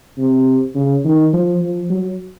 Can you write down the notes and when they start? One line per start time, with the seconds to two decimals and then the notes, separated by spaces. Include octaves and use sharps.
0.18 C3
0.75 C#3
1.04 D#3
1.33 F3
1.62 F3
1.90 F#3